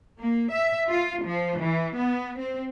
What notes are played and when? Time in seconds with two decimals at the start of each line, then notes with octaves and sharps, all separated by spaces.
0.18 A#3
0.51 E5
0.88 F4
1.24 F3
1.60 E3
1.95 B3
2.39 C4